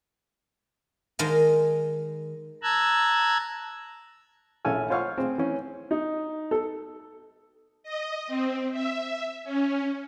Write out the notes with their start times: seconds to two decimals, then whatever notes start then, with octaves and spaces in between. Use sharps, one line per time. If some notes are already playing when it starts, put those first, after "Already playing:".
1.19 D#3 G#3 D#5 A5 A#5
2.63 A5 A#5 E6 F#6 G#6
4.65 A#1 C#4 E4 A4 G#5 F6
4.90 F4 C5 C#5 F5 F#5 C#6
5.18 C4 G#4 C5
5.38 E3 C#4
5.91 D#4
6.51 A4
7.83 D#5
8.27 C4
8.72 E5
9.44 C#4